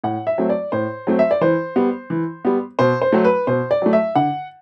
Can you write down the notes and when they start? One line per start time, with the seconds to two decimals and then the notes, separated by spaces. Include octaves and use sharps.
0.04 A2 F#5
0.27 E5
0.38 F#3 A3 C4
0.49 D5
0.72 A2 C5
1.07 F#3 A3 C4
1.19 E5
1.31 D5
1.41 E3 C5
1.76 G3 B3
2.10 E3
2.45 G3 B3
2.79 B2 C5
3.02 C5
3.13 F#3 A3
3.25 B4
3.47 B2 C5
3.71 D5
3.82 F#3 A3
3.93 E5
4.15 D3 F#5